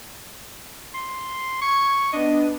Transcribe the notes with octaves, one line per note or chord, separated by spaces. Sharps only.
C6
C#6 G#6
B3 D4 D#5